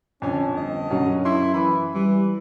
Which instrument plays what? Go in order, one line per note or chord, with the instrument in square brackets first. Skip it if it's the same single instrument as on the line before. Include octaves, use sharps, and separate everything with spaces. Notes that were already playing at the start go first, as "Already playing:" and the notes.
[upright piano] F2 D3 [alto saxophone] C#4
[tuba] G1 [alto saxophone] D#5
[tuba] F#2 [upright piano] D3 F#3 C#4
[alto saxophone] E4 [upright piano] C6
[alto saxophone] E3 [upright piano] B5
[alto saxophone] E3 [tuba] G3